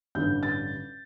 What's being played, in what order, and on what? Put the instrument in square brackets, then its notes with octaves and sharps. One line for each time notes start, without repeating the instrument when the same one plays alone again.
[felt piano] A1 G2 D3 G6
A6